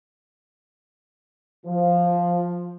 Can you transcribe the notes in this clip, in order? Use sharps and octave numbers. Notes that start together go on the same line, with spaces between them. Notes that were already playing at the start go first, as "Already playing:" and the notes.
F3